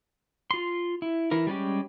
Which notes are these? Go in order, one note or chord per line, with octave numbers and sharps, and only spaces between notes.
F4 C6
E4
E3 E4 A#4
G3 G#3 C#4 G4